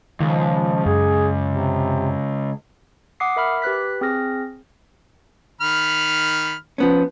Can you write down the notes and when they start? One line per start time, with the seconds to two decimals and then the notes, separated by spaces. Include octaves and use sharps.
0.21 C#2 D#3 F3
0.86 F#2 G#4
1.46 C3
3.20 F#5 D6 D#6 C7
3.36 A#4 E5 B5 F6
3.62 G4 B4 F#6 B6
4.01 C4 G#4 F6 A#6
5.61 D#3 B5 F6
6.78 F3 B3 C#4